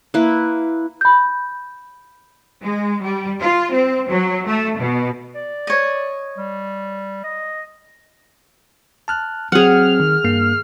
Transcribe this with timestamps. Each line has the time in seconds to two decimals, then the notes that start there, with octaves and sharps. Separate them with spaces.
0.14 A#3 E4 B4
1.01 B5 G6
2.61 G#3
3.02 G3
3.39 F4
3.73 C4
4.09 F#3
4.47 A3
4.78 B2
5.35 D5
5.67 C#5 D#5
6.38 G3
7.24 D#5
9.08 A5 F6 F#6
9.52 F#3 C4 G#4 F#5 F6
10.00 D#3
10.24 G2 A#3 C7